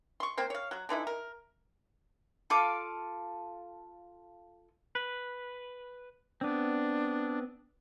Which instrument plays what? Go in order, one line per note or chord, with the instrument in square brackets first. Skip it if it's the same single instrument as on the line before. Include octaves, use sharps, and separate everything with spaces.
[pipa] C6 C#6
A#3 C4 C5
C#5 F5
F#3 F#4
D3 E3 D#4 E4
A#4
[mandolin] F4 A4 F5 D6
[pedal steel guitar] B4
[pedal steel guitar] B3 C4 [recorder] D4